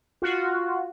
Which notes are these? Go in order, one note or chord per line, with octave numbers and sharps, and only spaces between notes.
F4 F#4